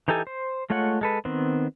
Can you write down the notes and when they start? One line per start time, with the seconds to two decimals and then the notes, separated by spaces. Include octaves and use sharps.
0.08 E3 D#4 G4 A4 G#5
0.27 C5
0.70 G#3 A3 F4 C#5 F#5
1.01 G#3 A4 B4
1.25 D#3 B3 C4